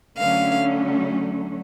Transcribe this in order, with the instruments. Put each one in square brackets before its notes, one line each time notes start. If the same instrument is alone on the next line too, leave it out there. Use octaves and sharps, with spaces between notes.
[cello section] D3 F#3 A3 C#4 [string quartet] F5